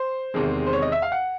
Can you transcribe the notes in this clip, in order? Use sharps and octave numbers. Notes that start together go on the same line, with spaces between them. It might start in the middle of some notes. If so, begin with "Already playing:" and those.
Already playing: C5
E2 C3 D#3 G#3
C5
C#5
D#5
E5
F5
F#5